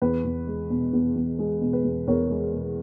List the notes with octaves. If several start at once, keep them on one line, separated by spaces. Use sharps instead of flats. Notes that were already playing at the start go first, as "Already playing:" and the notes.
E2 B4
E2
G#3
B2
E2
E2
G#3
B2
B4
E2
E2 A#4 C#5
G#3
B2